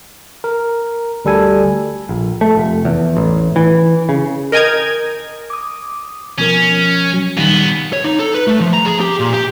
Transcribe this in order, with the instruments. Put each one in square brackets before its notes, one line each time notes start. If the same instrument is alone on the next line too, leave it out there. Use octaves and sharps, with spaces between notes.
[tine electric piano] A#4
D2 G3 A4 G#5
[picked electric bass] A#1
A3
F1
E2
A1
E3
C#3
[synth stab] A#4 D#5 G5 G#5 A#5 G#6
[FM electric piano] D6 D#6
[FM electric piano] B2 F3 A#4 [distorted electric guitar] C#4
[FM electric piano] F#3
[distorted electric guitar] A#2 B3 [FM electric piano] D#3 G3
[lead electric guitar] C#5
D#4
A4
B4
A3
F3
A#5
G#4
G4
A#2
G4